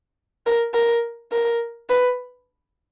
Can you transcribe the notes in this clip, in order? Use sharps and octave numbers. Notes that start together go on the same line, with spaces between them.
A#4
A#4
A#4
B4